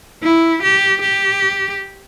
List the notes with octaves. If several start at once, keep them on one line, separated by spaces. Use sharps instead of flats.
E4
G4
G4